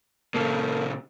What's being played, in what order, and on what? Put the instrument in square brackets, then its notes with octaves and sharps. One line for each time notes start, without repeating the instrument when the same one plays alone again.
[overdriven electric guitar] A#2 C#3 [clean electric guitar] A#3 A4 F5